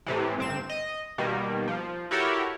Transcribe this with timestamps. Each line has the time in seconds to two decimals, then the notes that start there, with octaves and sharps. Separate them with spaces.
0.06 A2 C3 E3
0.38 G1 C4 E7
0.69 D#5
1.18 B2 D#3 G3 A#3
1.68 F3
2.11 E4 F#4 G4 A4 A#4 C#5